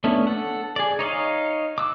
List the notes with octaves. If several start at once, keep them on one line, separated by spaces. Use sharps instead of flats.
A3 B3 C#4 D4 E4
A4 F#5
G#4 D5
D#4 C#5 D#5 F5
D6 E6 F#6